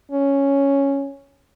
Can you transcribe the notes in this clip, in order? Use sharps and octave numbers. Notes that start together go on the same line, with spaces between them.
C#4